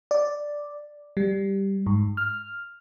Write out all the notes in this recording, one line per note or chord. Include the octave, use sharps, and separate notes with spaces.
D5
G3
G#2
F6